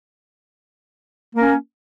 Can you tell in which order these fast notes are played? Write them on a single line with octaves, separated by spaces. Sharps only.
A#3 A#4 C#4